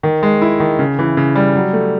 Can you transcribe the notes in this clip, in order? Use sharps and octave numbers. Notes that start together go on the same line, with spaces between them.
D#3
G#3
E4
D#3
C#3
E3
C#3
G3
F#3
A3